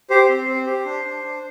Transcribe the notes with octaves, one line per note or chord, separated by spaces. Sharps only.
G4 C5
C4
C4
G4
D4
D4
D4